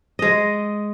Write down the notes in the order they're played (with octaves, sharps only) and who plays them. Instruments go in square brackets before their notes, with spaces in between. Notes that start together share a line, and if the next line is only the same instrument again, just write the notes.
[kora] G#3 D#5